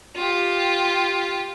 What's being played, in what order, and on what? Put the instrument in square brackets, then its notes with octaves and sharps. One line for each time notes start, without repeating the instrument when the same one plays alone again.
[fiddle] F4 G4